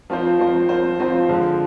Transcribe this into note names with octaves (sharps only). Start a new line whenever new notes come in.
F3 C4 F4 C5
F3 C4 F4 C5
F3 C4 F4 C5
F3 C4 F4 C5
D3 F3 G#3